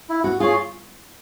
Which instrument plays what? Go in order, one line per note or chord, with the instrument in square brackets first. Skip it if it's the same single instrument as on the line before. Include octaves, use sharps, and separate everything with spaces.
[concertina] E4
[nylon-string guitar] F#4
[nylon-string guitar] F4 [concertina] G#4 C#5